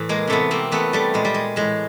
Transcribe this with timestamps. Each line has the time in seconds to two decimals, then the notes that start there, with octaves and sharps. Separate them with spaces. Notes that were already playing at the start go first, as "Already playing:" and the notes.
Already playing: A2 E3
0.09 G#3 A#3
0.27 C3 E3 A3 B3
0.51 A#3 C4
0.71 C3 E3 A3 B3
0.93 G3 A3
1.14 A#2 G#3
1.25 G3
1.34 G#3
1.56 A2 E3 G#3